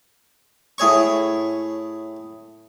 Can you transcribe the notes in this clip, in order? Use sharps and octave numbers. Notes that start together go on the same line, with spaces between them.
A2 G#4 C#5 C#6